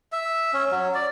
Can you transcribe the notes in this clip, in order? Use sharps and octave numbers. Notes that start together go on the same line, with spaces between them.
E5
C#4
F#3
D5